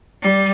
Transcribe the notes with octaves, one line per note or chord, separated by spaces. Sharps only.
G3